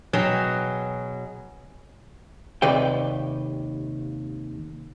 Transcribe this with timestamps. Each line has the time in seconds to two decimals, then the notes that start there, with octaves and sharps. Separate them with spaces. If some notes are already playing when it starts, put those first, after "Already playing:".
0.13 B2 F#3 G#4 E5 G5 A#5
2.62 D#2 C3 B4 D5 G5